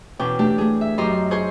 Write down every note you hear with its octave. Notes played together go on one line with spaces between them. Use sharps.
E2 B2 C#4 G5 D6
A3 D4 G4
A3 G#4
E5
F#2 D4 G4 D#5 A#5 C6
G#4 C5 G#5 C6 C#6